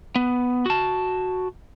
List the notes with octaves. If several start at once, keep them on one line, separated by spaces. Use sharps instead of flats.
B3
F#4 A5